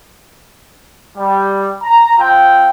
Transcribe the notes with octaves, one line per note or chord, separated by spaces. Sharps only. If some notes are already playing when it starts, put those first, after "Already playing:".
G3
A#5
C4 F4 G5